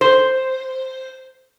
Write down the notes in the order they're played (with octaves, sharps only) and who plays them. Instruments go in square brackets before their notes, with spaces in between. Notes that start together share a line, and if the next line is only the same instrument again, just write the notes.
[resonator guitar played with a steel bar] C5